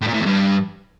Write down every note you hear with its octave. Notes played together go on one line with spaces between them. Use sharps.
A2
A#2
A2
E2
G2